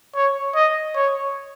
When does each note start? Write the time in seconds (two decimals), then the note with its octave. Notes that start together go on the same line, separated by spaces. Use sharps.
0.15 C#5
0.55 D#5
0.95 C#5